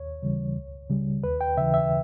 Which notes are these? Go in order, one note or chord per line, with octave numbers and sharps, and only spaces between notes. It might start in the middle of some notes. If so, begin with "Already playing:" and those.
Already playing: D#2 C#5
C#3 E3 G3
C#2
C#3 G3
D#2 B4
G5
C#3 E3 E5
E5